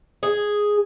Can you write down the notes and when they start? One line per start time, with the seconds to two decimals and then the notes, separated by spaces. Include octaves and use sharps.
0.23 G#4